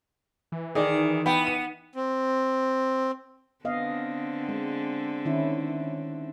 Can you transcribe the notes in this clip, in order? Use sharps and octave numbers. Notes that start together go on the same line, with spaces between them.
E3
D#3 G#4 D5
B3 G5 B5
D#7
C4
D3 B3 C4 D#5 F5
G#3
D#3 C#4 E4